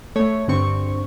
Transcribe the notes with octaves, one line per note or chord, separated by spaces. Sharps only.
A3 C#5
G2 D3 C4 C#6